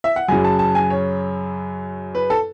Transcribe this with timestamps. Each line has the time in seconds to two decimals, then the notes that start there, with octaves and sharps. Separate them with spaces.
0.04 E5
0.16 F#5
0.28 F#2 C#3 F#3 G#5
0.44 A5
0.59 A5
0.75 G#5
0.90 C#5
2.15 B4
2.30 A4